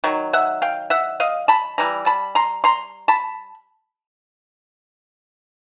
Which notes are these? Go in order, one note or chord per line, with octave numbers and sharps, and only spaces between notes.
D#3 F#3
E5 F#5
F5 G5
E5 F#5
D#5 F5
A5 B5
E3 G3 A#5
A5 B5
A#5 C6
A#5 C6
A5 B5